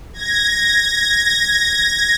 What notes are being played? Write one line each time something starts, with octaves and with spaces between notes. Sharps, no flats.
G#6 A#6